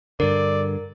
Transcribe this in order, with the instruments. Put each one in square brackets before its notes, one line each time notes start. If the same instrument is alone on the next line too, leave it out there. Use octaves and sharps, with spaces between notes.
[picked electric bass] G2 D3 [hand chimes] A#4 [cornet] D5